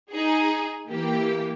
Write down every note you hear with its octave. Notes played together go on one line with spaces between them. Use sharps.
D#4 G#4
E3 A#3 G4